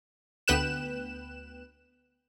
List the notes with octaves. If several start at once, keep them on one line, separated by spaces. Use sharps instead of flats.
D2 B3 B4 G5 F#6 E7